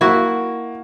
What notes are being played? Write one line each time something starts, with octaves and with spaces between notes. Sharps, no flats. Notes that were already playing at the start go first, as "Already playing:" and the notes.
A#3 E4 F#4